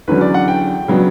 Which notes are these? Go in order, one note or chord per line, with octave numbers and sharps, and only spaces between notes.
E2 D3 F#3 C#4 B4
D5
F#5
G5
C#3 F#3 B3 D4